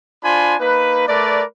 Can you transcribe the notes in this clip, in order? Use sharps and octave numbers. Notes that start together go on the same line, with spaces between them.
D4 F4 C5 G#5 B5
A#3 D#4 B4
A3 A#4 B4 D5